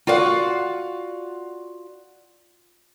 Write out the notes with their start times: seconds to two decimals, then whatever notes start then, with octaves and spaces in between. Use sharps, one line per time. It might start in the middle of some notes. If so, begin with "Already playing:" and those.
0.07 F4 F#4 D5 F5 F#5